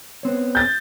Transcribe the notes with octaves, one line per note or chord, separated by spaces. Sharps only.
B3 C4 C#5
G6 A6